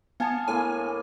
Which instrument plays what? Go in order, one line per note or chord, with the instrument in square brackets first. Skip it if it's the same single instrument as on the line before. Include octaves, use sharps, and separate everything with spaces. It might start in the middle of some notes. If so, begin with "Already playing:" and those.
[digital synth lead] B3 [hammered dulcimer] F5 G#5 A5
[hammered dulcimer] A2 A#3 [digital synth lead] G#5